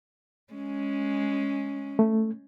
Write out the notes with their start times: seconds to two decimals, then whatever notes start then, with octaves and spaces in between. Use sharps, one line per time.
0.53 G#3 C#4
1.99 A3